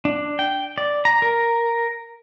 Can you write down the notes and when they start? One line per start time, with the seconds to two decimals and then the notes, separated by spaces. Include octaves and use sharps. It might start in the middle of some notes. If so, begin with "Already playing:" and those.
0.05 D4
0.39 G5
0.78 D5
1.05 A#5
1.22 A#4